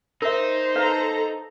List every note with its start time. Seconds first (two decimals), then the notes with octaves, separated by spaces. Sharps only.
0.22 D#4 A#4 C5 E5
0.76 A4 B4 F5 A#5